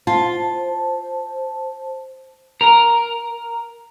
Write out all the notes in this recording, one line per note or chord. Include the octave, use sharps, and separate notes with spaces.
F4 C5 A5
A#4